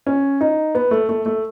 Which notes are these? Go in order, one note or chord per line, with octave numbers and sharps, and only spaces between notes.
C#4
D#4
B3
A3
A3
A3